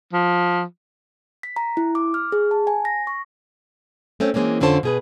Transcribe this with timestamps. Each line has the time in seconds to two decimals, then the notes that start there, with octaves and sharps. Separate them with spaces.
0.13 F3
1.43 B6
1.56 A#5
1.77 E4
1.95 D6
2.14 F6
2.32 G#4
2.51 A5
2.67 G#5
2.85 A#6
3.07 C#6
4.20 A3 C4 C#4
4.34 E3 G#3 A#3 C4 C#4
4.60 F2 D3 C#4 F4 C5 A5
4.83 B2 G#4 B4